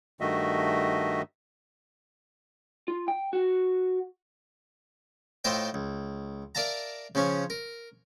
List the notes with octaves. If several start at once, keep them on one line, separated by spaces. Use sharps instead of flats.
G2 D#3 A3 F#4 D#5 E5
F4
G5
F#4
A2 F4 C5 D#5 E5 G5
C#2
A#4 D5 E5 F5 A5 A#5
C#3 F3 C#4 C#5
A#4